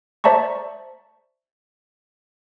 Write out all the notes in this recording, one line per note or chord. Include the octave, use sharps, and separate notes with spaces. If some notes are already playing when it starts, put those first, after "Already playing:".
C5 D5 E5 A5 A#5 C#6